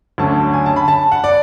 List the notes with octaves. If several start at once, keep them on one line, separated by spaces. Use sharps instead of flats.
D2 D3 F#3 C#4 A5
G#5
A5
B5
A5
F#5
D5